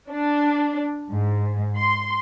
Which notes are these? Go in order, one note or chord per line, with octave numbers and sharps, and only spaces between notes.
D4
G#2
C6